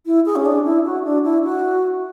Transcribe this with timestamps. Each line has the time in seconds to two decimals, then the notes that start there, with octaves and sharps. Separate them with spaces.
0.06 E4
0.26 G#4
0.36 C#4
0.46 D4
0.65 E4
0.85 F#4
1.05 D4
1.24 E4
1.44 F#4